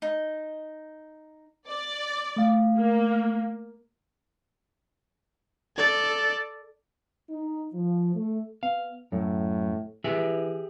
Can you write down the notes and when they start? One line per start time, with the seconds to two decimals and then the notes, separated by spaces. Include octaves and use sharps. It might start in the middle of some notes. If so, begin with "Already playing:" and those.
0.02 D#4
1.67 D5
2.36 A3 F5
2.77 A#3
5.76 A4 D5
7.30 D#4
7.74 F3
8.15 A3
8.63 B3 F5
9.12 F#2 A2
10.04 E3 G4 G#4 E5